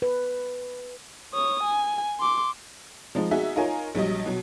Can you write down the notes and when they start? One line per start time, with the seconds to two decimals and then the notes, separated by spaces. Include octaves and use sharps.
0.02 B4
1.34 C#5 D#6
1.63 G#5
2.20 C6 D6
3.15 F3 G#3 D#4
3.31 D#4 F#4 G#4 E5
3.56 D#4 F4 A#4 C#5 G#5
3.95 A#1 F#3 G3 D#5
4.26 B2 F#3